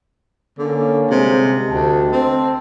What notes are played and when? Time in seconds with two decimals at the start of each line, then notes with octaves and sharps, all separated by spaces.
0.58 D3 A#3 C#4
1.10 G#2 C3 G3 G#3
1.70 D2 D#5 G5 A5
2.12 C4